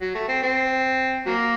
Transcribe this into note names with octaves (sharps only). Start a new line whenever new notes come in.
F#3
A3
C4
C4
F#3 A#3